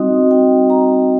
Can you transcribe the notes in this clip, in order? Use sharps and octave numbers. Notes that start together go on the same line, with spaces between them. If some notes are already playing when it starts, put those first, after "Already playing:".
Already playing: G3 C4 D#4 F#4 D#5
G5
A#5